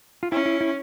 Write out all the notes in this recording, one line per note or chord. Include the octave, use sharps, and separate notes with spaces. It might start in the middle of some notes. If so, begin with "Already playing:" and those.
F4
C#4 E4
E4
E4